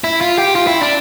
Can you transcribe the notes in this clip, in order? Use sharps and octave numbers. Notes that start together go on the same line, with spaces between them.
E4
F4
G4
F4
E4
D4